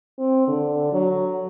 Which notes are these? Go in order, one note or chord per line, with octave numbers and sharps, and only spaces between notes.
C4
D3
F#3